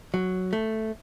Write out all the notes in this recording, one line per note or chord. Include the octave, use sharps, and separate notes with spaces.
F#3
A3